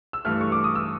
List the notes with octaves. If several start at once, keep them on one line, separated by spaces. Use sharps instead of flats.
E6
G2 E3 A3 F6
C#6
D6
D#6
E6